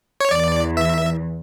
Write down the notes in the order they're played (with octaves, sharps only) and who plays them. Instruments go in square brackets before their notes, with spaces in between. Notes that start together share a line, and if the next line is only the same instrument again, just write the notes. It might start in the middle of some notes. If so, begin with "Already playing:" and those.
[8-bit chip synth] C#5
[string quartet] E2 E3 [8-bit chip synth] D5
[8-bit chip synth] E5